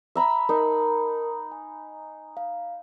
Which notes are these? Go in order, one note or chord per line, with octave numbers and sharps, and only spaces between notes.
E5 A#5 B5
D#4 A#4 A5
G#5
F5